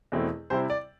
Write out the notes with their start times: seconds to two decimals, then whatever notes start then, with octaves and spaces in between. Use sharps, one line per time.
0.12 E2 B2 A3 C4 E4
0.50 C3 G3 C4 E4 C5
0.70 D5